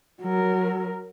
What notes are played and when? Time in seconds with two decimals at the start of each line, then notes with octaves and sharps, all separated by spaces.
0.22 F#3 A#4